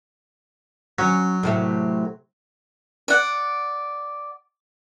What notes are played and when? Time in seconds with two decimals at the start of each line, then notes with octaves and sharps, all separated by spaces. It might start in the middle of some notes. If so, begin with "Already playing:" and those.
0.99 F#3 C#4
1.43 A2 C3 A3
3.08 D5 F#5